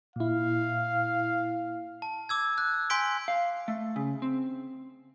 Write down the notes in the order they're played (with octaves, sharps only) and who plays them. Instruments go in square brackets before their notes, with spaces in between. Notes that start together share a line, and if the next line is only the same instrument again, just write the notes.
[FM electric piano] A#2 E4 [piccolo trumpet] F5
[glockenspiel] A5
D6 E6 G#6
F#6
G#5 C6 G6 B6 D7 G7
[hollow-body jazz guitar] F5
A3
C#3
C4